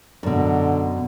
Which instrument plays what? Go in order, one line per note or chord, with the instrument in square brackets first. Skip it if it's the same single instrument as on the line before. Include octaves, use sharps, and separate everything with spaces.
[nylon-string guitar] F#2 B2 [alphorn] D3